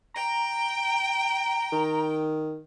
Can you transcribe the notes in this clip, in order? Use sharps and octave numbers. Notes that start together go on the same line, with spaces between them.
G5 A#5
D#3